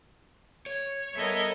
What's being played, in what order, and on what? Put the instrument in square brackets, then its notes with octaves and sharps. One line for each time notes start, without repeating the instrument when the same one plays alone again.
[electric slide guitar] C#5
[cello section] G3 B3 A4 [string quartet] A#4 D#5 E5